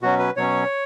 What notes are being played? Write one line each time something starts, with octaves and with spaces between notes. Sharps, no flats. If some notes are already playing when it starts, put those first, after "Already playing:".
B2 F#3 C#4 F#4
B4
B2 F#3 C#4 C#5